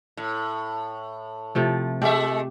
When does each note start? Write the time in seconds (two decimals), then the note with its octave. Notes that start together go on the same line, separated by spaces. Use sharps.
0.17 A2
1.55 C3 F3 A3
2.02 G#3 A3 G4 E5